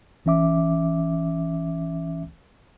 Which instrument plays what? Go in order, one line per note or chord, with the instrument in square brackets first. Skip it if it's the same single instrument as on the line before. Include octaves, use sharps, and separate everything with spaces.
[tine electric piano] G#1 E3 C#4 E5 D6